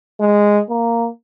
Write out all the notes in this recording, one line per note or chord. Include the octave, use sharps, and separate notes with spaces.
G#3
A#3